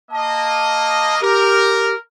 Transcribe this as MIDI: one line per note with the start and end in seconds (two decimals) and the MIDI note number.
0.11 1.21 58
0.11 1.21 75
0.11 1.15 81
1.21 1.94 67
1.21 1.97 70